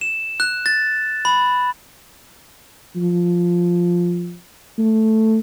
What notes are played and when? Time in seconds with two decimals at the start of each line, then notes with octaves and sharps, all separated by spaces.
0.01 E7
0.40 F#6
0.66 A6
1.25 B5
2.96 F3
4.79 A3